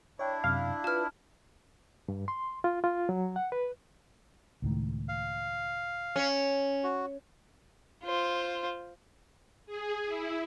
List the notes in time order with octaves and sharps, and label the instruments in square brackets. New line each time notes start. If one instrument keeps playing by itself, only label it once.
[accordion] D4 E4 [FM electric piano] C#5 G5
[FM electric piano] F#2 C3 [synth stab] F5
[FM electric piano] F4 B4 [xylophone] A5 F6
[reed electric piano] G2
C6
F4
F4
F#3
F#5
B4
[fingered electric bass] C#2 A2 D#3
[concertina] F5
[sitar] C#4
[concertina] F#4
[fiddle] F4 C5
[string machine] G#4
E4